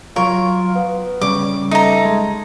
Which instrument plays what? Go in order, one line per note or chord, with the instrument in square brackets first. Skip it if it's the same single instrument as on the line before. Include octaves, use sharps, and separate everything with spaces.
[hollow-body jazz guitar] F#3 C#5 [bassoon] F4 [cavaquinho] A#4
[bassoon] B3
[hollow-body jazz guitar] C#3 G3 [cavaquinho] D6
[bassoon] A3 [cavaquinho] D#4 A#5
[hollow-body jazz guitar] G#3